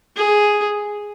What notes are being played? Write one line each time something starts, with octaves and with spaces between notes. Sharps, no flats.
G#4